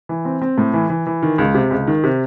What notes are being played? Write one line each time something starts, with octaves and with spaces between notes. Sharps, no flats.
E3
C4
C4
A2
E3
E3
E3
D#3
C#2
C3
C#2
D#3
C3